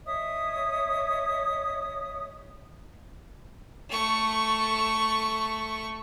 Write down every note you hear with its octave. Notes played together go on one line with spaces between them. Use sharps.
C#5 D#5 E5 D#6
A3 C#6